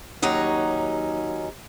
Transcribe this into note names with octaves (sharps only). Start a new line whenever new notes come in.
D#2 F#3 C#4 D#4 F#5